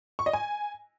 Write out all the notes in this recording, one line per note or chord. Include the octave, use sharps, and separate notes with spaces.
C#6
D#5
G#5